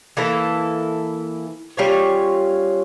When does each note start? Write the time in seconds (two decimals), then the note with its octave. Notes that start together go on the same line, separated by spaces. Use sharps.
0.17 E3 A#3 E4 A4
1.77 G3 C#4 F4 C#5